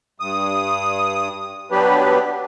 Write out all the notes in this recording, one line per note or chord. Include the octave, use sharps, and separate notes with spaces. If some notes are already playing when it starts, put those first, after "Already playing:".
G2 D#6
F#3 B3 D4 G4 B4